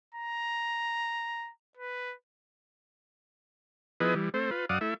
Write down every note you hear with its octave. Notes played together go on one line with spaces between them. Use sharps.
A#5
B4
F3 B3 E4 G#4 B4 D#5
E3 G3
A3 C4 C5
F4 B4
F#2 D5 F5 F#5 D#6
A3 E4 E5